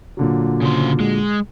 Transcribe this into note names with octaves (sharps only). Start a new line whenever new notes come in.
A#2 D3 F#3
C#3 C5
G#3